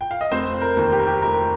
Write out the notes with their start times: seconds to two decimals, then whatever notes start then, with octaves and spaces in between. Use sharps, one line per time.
0.01 G5
0.11 F5
0.21 D#5
0.31 F1 C4 C5
0.62 A#4
0.77 D#2 D#3 A#3
0.92 G4
0.99 A#4
1.07 G4
1.22 F1 A#4